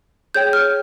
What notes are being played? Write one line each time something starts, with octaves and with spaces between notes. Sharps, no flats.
G#4 C#5 G5 G6
F6